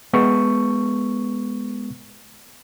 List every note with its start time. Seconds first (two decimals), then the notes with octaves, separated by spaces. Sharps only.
0.13 G#3 B3 C#6